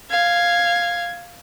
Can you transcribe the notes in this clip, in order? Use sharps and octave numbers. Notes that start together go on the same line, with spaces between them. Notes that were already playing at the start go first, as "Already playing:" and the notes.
F5 G#6